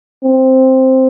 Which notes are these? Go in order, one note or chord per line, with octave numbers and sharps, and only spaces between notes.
C4